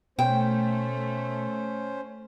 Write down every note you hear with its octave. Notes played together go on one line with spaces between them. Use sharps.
B2 A3 C#4 C5 G5